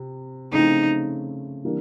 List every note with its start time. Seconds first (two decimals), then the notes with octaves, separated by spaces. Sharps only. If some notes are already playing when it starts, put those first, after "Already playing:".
Already playing: C3
0.52 C#3 F3 A3 C4 D#4 E4
1.65 E3 G3 A#3 D4